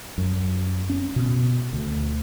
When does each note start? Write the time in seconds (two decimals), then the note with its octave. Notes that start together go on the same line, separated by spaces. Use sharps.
0.18 F#2
0.89 C#4
1.16 B2
1.73 D2